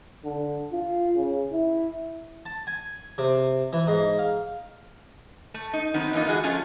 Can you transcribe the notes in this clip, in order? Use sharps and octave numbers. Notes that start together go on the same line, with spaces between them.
D3
F4
C#3
E4
A5
G#5
C3
E3
G#2
F5
A3
D#4
D#3 F#3 B3 C4 D#4
E3 F#3 A#3 D#4 F4
E3 G#3 F#4 G#4 D#5
F3 A3 C#4 F4